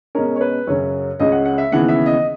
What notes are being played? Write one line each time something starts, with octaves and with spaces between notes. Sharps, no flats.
B2 G#3 C#4 A#4
C#5
B4
F#2 C#3 F#3 C#4 C#5
C#2 C#3 G#3 C#4 D#5
F#5
F#5
E5
D#2 C#3 E3 B3 F#5
E5
D#5